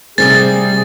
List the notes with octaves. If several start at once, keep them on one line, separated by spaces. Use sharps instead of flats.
C3 G3 C4 G#4 A6